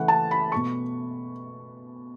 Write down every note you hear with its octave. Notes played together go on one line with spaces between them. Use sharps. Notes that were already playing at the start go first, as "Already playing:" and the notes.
Already playing: C#3 E3 A3 F#5
A5
B5
B2 A3 C#6